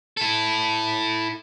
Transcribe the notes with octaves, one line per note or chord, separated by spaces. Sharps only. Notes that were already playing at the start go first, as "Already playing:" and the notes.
E4 A4